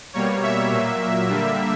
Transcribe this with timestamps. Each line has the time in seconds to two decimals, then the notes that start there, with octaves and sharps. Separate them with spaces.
0.13 B2 G3 A#3 C#5
0.43 E5
0.71 A#2 F#3 A#3
1.29 D3 G3 A#3